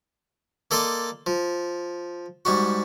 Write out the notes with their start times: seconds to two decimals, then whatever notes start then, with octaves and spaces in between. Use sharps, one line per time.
0.71 A#3 A4 D5 D#5 C6
1.26 F3
2.45 G#2 G3 F#4